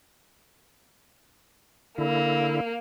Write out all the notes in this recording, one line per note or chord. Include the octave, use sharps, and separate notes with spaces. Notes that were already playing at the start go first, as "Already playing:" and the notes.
D3 A#3 E4